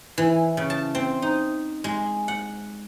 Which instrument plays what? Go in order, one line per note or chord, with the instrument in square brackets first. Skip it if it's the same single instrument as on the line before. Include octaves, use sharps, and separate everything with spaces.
[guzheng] E3
C#3
A5
C4
D#4
G#3
F#5